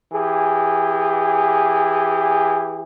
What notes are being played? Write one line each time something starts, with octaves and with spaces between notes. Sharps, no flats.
E3 G4 G#4